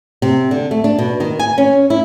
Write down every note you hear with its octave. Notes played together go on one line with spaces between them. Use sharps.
C3
D3
A3
D4
B2
D#3
G#5
C#4
E4